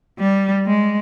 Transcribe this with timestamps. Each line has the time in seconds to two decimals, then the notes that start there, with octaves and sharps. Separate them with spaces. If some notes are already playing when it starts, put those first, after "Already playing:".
0.19 G3
0.66 G#3